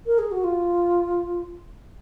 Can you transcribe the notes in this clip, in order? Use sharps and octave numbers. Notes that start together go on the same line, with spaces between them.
A#4
G#4
F#4
F4